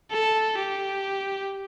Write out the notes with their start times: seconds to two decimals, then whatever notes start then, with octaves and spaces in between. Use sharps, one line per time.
0.12 A4
0.59 G4